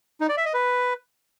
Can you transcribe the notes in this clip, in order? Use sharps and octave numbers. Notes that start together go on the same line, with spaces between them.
D#4
D5
E5
D#5
B4